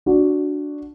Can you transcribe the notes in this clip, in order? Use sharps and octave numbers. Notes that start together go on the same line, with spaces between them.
D4 F#4